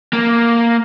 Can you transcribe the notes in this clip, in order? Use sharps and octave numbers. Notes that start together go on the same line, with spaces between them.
A#3